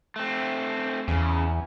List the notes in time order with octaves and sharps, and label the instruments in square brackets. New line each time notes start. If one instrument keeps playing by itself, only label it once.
[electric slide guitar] A3 C4
[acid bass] E2 [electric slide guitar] C#3